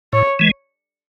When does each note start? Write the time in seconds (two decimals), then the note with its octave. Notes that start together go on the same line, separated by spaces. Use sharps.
0.13 A2 C#5
0.39 E3 G#3